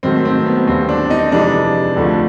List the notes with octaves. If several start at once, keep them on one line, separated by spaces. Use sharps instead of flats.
G#2 D#3 F#3 A3 C4
C4
B3
D#2 D3 G3 C4
D4
D#4
F2 C3 E3 G#3 D4
D2 D3 F3 A3